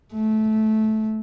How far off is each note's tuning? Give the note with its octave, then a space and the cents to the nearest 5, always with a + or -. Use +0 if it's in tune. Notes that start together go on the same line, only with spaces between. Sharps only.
A3 -15